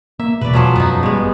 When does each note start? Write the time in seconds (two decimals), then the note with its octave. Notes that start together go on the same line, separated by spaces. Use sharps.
0.19 A#3 E5
0.41 D#1 E2 B2 B4 D5
0.53 F3 F#3 C#4
0.76 F#2 F3 B3 D#4
1.03 G#1 G2 G#3 B3